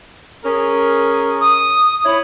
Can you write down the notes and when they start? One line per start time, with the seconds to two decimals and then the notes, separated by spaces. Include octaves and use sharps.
0.44 C#4 G#4 A#4
1.41 D#6
2.05 E4 C#5